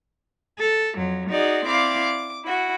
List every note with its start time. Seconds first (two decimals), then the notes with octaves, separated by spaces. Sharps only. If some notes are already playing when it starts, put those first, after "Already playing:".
0.57 A4
0.96 F2 F#3
1.29 D#4 F#4 G#4 D5
1.65 C4 E4 D5 F5 D6
2.03 D6
2.44 E4 F#4